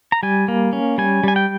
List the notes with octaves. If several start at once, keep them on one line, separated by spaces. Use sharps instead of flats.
A#5
G3 G#5
A#3
C#4
G3 G#5
G3 G#5
G5